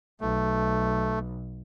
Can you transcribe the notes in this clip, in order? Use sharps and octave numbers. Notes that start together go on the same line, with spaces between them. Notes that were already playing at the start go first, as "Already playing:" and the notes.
B1 A3